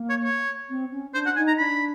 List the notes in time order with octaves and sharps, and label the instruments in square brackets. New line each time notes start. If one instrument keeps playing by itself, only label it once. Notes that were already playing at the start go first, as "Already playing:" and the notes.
Already playing: [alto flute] A#3
[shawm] C#5
C#5
[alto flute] C4
C#4
[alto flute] D4 [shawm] C5
[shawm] F#5
[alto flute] D#4 [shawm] G#5
[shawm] A#5
[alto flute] D4 [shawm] B5